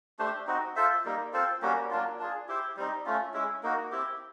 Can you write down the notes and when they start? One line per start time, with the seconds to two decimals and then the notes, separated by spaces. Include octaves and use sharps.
0.19 A3 D4 G4 C5
0.47 C4 D#4 F#4
0.76 F4 A4 C5 E5
1.05 G3 A#3 D#4
1.33 C4 F4 A4 C5
1.62 G3 A#3 C#4 F#4
1.90 F#3 A#3 D4 F4
2.19 D4 F4 G#4
2.48 E4 G4 C5
2.77 G3 C4 D#4
3.06 A3 C#4 F4
3.34 G#3 C#4 E4
3.63 A#3 D#4 F#4
3.91 C4 E4 G4